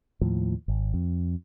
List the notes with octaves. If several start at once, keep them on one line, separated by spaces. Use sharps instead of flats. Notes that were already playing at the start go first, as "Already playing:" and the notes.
D#2 A2 F3
G#1
F2